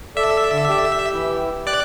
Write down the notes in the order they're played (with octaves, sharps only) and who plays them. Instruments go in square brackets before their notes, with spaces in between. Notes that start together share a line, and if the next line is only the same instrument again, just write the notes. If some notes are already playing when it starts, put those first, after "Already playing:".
[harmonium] A4 D5 [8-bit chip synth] E5
[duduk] D3
G4
[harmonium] E3 E4
[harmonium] G4 [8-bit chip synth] D5 F#6